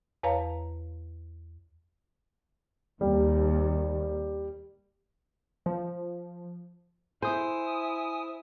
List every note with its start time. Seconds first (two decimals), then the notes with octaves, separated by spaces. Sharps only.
0.23 E2 B4 C#5 F5 A5 A#5
3.01 D#2 G3
5.66 F3
7.22 E4 C5 G#5 D#6